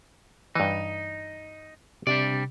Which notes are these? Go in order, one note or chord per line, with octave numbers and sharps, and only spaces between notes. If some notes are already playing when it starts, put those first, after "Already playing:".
G2 E3 D#4
C3 G3 D4 D5